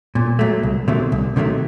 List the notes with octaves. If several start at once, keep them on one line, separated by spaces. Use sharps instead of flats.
A#2
F#3 A3
C2
C3 D#3 F#3 A3
C2
C3 D#3 F#3 A3